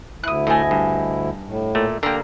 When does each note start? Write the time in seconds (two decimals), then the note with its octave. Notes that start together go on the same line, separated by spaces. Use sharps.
0.23 D2 E4 D#6 F#6
0.47 A2 A3 D#5 G#5
0.71 G2
1.47 A2
1.75 A#2 A3
2.03 D3 A#3 G4 A#4 A#5